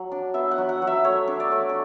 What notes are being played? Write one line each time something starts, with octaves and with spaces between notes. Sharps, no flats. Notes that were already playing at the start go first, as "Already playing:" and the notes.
Already playing: F#3
D4
B3 E5
F#5
F#3
F#5
F#3
E5
A3 C#5
D4
D5
A3
A4